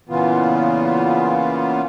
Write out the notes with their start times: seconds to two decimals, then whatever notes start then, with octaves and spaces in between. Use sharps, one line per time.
0.09 A#2 C#3 E3 B3 F4